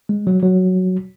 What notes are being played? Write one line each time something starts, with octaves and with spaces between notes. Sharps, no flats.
G#3
F#3
F#3